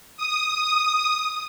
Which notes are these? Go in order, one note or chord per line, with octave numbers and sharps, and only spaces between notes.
D#6